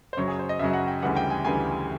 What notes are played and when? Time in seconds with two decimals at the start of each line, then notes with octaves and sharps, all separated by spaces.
0.13 C5
0.17 F#2 C#3 F#3 C#5
0.28 G#4
0.39 C5
0.49 D#5
0.59 F#2 C#3 F#3 E5
0.73 F#5
0.88 G5
1.02 D2 C#3 E3 G3 F#5
1.16 G5
1.30 G#5
1.44 D2 C#3 E3 G3 G#5